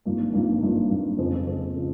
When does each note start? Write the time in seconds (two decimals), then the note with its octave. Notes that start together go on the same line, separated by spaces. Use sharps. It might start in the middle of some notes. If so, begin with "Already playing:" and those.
0.05 G#1 G2 F3 A#3
0.34 G#1 G2 F3 A#3
0.61 G#1 G2 F3 A#3
0.90 G#1 G2 F3 A#3
1.18 F2 C#3 F3 G#3
1.47 F2 C#3 F3 G#3
1.76 C#3 F3